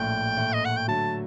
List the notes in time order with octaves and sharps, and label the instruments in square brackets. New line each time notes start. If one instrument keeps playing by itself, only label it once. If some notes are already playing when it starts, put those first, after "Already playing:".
Already playing: [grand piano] A#1 A2 A3 [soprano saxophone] G5
[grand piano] A#1 A2 A3
[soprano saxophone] D#5
F#5
G5
[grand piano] D3 F#3 A3 [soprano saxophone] A5